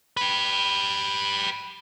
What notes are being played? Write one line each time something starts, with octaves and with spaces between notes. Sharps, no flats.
G4 B4